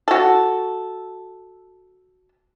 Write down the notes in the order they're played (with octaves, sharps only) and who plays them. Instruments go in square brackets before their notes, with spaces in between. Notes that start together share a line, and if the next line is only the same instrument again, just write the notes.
[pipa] F#4 A4